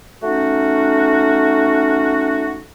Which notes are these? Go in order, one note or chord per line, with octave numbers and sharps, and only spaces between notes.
A3 C#4 D#4 F#4